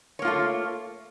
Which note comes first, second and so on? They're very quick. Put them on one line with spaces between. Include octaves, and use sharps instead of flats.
C#5 A#3 F4 A3